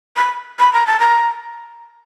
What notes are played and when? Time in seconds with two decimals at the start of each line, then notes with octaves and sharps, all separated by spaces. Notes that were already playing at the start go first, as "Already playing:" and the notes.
0.16 B5
0.59 B5
0.73 A#5
0.87 A5
0.99 A#5